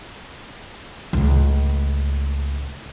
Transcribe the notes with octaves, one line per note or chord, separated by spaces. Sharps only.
C#2 A2